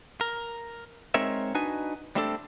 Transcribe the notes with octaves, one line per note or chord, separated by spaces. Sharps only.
A#4
G#3 C4 D#4 A#4 C#5 E5
D4 D#4 F#4 B4 D#5 G#5
G3 A3 C4 D4 G4 A4